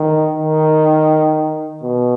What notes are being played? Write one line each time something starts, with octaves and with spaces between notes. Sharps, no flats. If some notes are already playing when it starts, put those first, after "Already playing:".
Already playing: D#3
D#3
B2